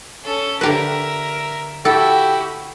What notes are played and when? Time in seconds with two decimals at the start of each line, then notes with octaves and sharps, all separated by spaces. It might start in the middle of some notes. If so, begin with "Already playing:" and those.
0.24 C#4 A4
0.61 D3 G4 A#4 B4 E5
1.85 E4 F#4 G4 A4